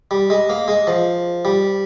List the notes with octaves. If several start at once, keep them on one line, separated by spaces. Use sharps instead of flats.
G3
G#3
A#3
G#3
F3
G3